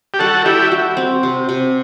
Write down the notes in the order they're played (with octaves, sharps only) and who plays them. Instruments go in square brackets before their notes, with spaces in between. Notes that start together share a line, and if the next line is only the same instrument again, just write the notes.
[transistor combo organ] G4
[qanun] G3 [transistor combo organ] F#4 A4
[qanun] G3 [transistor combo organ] E4 G4
[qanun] F#4
C4
C3
C3